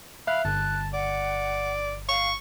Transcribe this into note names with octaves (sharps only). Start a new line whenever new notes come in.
E5 F5 B5 F#6
G1 A5 F#6
D5 F#5
F5 C#6